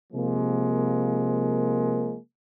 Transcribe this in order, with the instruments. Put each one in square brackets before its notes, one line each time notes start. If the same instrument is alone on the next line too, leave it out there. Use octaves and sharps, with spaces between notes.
[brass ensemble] C3 F3 G#3 A#3